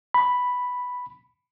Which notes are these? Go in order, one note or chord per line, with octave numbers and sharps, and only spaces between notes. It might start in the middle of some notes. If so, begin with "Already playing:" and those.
B5